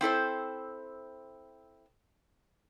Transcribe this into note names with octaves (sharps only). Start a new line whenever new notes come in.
C4 E4 A4 C5